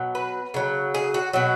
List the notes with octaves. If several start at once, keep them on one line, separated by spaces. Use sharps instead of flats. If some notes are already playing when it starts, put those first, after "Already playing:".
Already playing: B2 F#3
B4
C#3 F#3
G#4
F#4
B2 F#3 F#4